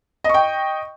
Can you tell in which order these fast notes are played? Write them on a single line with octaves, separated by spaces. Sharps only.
D#5 C#6 G5